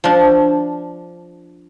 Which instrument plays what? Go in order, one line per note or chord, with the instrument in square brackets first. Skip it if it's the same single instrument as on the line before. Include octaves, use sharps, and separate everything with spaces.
[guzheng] F3 D4